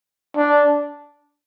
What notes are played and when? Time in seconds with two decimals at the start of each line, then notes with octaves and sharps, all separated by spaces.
0.36 D4